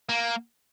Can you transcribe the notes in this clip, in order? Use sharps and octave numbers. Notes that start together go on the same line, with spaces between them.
A#3